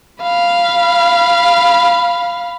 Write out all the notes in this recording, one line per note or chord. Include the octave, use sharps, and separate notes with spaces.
F5 B5